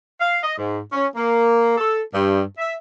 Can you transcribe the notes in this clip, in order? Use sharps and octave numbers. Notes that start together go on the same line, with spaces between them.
F5
D#5
G#2
C#4
A#3
A4
G2
E5